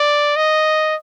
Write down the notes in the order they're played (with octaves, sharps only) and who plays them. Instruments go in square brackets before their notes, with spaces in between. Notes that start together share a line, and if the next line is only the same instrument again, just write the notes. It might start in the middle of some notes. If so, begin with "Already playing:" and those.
Already playing: [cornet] D5
D#5